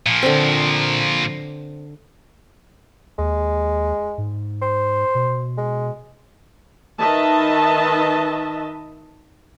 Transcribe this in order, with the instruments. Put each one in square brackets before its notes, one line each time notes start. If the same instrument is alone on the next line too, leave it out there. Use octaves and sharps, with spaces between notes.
[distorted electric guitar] A#2 F3
[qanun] D3 C4
[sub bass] D#2 [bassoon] G#3
[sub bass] G#2
[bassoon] C5
[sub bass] B2
[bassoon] G#3
[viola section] D#3 B4 D#5 E5 A5